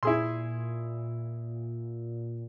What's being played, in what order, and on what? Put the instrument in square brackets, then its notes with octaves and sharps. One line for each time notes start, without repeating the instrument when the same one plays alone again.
[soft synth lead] A#2 [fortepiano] E4 G#4 C6